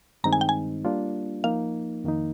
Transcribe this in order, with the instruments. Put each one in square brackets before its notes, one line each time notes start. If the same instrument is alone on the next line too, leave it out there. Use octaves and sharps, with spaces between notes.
[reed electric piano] G2 D#3 G#3 C4 D#4 [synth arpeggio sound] A#5
[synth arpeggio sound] G#5
G5
G#5
[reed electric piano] G3 A#3 D4 F4
[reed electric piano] F3 A#3 D#4 [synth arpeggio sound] F5
[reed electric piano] F2 D#3 A#3 D#4